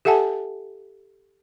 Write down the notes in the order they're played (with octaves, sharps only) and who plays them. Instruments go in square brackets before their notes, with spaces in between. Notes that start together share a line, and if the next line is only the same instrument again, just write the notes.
[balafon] G4 A4 E5 F#5 G#5 A5